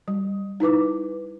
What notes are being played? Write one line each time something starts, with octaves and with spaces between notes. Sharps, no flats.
G3
D#4 E4 B4 D6